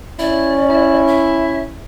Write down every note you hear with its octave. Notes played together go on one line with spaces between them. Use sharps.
C#4 E4 D5
E4
E5